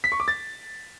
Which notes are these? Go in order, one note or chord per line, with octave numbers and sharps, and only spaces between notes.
B6
C#6
D6
A6